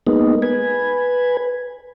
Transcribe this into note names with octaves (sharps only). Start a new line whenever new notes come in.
G#3 A#3 B3 D#4
B4 G#5